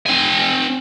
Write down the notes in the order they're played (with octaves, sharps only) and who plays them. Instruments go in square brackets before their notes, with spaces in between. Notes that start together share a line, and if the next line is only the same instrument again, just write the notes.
[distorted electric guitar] C4 G#5